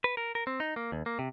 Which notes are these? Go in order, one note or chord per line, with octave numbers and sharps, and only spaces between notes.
B4
A#4
A#4
C4
D#4
A#3
D#2
A#3
C3